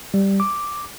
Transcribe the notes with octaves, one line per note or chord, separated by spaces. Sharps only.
G3
D6